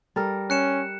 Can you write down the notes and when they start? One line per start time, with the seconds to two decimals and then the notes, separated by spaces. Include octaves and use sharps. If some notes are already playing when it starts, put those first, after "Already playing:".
0.16 G3 A4 A#4
0.50 C#4 F#6 C#7 E7